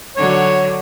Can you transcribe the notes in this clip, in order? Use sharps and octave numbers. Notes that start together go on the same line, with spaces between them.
D3 F#3 C#5